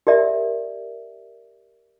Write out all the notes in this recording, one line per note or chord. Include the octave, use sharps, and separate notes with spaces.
G4 A#4 D5 E5